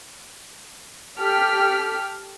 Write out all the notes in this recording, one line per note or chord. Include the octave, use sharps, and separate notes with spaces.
G4 A4 F6 B6